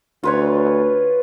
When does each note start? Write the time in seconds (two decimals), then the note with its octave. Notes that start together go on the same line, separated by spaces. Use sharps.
0.23 D2 F4 B4 C#5